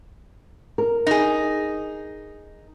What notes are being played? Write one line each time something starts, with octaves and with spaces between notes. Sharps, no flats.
A#4
D#4 G#4